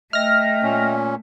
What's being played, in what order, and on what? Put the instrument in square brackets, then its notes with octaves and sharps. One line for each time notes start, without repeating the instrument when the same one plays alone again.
[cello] A3 [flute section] D#5 E5 G5 [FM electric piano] F6 A#6
[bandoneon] A#2 C#4